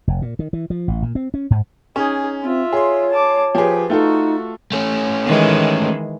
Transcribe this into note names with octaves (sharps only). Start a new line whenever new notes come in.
F1
A#2
D#3
E3
F3
A1
A#2
C4
C#4
G#2
C#4 D#4 G#4
C4 F4 E5
G#4 C#5 C6
A5 D6
F3 G4 G#4 B4
A3 D#4 F4 F#4 A4
A3 C#4
D#3 E3 G#3